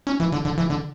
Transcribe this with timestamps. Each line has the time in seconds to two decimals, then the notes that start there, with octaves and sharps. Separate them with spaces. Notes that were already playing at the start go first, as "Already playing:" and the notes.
0.07 C#4
0.20 E3
0.32 D3
0.45 D3
0.58 E3
0.70 D3